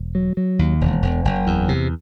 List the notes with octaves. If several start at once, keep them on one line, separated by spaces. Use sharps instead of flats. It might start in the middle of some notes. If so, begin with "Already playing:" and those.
Already playing: E1
F#3
F#3
D#2
E1
E1
F#1
E2
C3